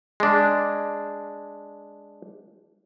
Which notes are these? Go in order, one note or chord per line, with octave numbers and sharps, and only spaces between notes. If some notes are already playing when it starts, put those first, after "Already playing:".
G#3 D4